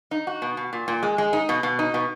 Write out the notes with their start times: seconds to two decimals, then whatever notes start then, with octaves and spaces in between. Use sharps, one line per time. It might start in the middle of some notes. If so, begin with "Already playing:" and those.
0.11 D#4
0.27 F#4
0.42 B2
0.57 B2
0.73 A#2
0.88 A#2
1.03 G#3
1.18 G#3
1.33 D#4
1.49 B2
1.63 B2
1.79 D#4
1.94 B2